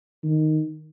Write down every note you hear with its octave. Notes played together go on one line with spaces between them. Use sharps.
D#3